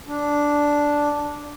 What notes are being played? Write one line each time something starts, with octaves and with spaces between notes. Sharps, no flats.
D4